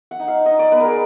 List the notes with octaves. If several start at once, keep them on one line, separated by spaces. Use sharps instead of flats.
F#5
D#4
F5
D#4 D#5
D5
B3 B4
G#4 A#4